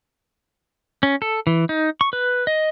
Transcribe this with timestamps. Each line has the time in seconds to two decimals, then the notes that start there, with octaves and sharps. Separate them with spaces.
1.03 C#4
1.22 A4
1.47 E3
1.69 D#4
2.01 C#6
2.13 B4
2.47 D#5